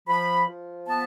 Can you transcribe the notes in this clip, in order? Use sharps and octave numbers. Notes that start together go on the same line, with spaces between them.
F3 B5
F3
B3 A5